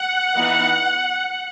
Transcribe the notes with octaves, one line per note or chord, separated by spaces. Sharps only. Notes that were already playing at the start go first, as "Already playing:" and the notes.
Already playing: F#5
E3 B3 D#4